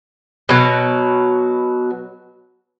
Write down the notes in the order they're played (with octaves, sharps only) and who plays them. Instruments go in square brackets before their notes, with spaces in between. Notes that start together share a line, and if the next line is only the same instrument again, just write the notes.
[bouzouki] B2 F#3